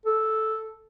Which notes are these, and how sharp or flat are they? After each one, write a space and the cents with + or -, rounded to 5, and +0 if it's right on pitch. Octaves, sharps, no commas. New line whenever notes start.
A4 -5